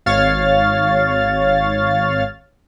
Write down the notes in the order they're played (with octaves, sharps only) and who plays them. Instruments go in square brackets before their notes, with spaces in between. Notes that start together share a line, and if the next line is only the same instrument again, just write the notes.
[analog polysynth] G#1 C#5 F5 F6 A6